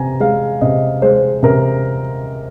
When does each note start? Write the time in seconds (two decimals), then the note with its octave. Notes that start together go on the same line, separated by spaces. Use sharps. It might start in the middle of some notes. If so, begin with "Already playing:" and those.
Already playing: C3 G#5 A#5
0.20 G#3 F5
0.61 C3 D#5
1.02 G#3 C5
1.43 C3 A#4